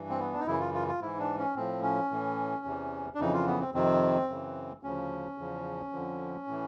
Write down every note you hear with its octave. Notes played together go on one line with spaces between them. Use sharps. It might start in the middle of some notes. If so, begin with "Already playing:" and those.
Already playing: G2 E3
C4
B3
D4
D#4
F#2 C#3 E3 E4
F4
F4
F4
G#2 E3 E4
D4
C#4
A2 F3 C4
C#4
A2 E3
E2 C3 E3
D4
F2 C#3 E3 D#4
F4
B3
C4
F2 C3 D#3 C4
F#2 C#3 E3
D2 C#3 F3 C#4
E2 C#3 F3
F2 D3 F3
A2 E3